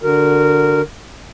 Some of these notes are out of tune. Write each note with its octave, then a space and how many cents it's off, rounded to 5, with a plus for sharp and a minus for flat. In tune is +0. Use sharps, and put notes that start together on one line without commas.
D3 +0 F#4 -5 A#4 -15